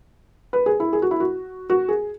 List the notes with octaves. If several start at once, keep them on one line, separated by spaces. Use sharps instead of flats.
B4
G#4
E4
G#4
F#4
E4
F#4
F#4
G#4